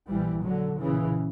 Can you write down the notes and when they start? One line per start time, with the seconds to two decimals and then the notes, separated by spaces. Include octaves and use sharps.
0.09 A#1 A#2 E3 G3
0.44 D3 F#3
0.80 A#1 A#2 C#3 E3